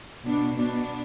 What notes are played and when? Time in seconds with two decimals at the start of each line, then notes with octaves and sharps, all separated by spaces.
0.25 B2 B3 D4
0.55 B2 B3 D4